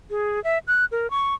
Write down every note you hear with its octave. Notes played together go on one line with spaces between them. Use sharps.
G#4
E5
F#6
A#4
C#6